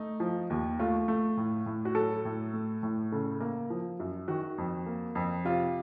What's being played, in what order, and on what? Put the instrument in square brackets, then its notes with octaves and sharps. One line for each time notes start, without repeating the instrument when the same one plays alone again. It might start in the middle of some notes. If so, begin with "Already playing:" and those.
Already playing: [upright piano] A3 D#4
F3
D#2
A3 F4
A3
A2
A2
F#4
F#3 A4
A2
A3
A2
C#3 A4
A#3
F3
F#2
D#3 F#4
F2
A#3
F2
C3 F4